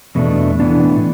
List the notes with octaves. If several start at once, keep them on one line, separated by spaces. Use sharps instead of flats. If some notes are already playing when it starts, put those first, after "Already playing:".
E2 B2 A3 D4
A2 E3 B3 D4